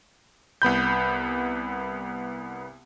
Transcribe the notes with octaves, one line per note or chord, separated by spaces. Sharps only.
C2 B3 B5 G6